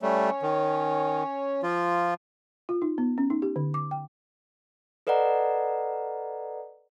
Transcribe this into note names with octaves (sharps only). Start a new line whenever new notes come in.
G3 A3 C#4 C#5
D#3
F3 F4
F4
D#4
B3
C#4
D#4
G4
D3
D6
G5
A4 B4 D5 D#5 F#5 A#5